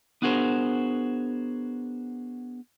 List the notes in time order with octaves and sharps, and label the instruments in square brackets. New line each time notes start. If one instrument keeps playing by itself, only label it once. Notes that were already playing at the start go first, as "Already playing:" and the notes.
[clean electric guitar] B3 D4 F#4 G#4 A#4 C5